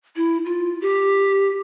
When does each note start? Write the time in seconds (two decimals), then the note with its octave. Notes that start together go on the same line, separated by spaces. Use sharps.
0.16 E4
0.45 F4
0.81 G4